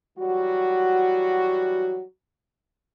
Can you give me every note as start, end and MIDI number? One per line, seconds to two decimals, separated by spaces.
0.19 2.02 52
0.19 2.02 54
0.19 2.02 55
0.19 2.02 66